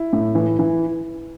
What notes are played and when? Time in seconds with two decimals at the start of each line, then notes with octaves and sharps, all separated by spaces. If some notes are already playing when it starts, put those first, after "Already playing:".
Already playing: E4
0.13 A2
0.35 E3
0.59 E3